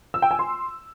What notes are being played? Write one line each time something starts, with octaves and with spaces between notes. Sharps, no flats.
E6
G5
G#5
C6